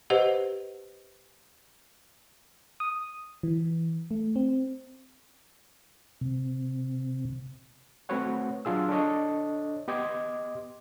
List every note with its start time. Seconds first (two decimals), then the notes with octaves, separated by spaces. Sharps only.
0.10 G4 B4 C5 D#5 F#5
2.80 D#6
3.43 E3
4.11 A3
4.36 C4
6.21 C3
8.09 A3 C4 F#4 B4 C#5 F#5
8.65 F#3 D4 F4 G#4 E6
8.89 D4 A4 C#5 D#5
9.88 B3 G4 D#5 C6 D6 G#6